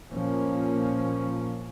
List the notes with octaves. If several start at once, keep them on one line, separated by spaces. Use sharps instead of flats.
A#2 F3 A#3 C#4